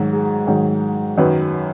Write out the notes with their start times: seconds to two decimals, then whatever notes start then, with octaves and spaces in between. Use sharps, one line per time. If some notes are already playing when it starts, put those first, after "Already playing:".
Already playing: G#2 D#3 F#3 F#4
0.13 G#4
0.47 G#2 D#3 F#3
1.18 F#2 D#3 F#3 B4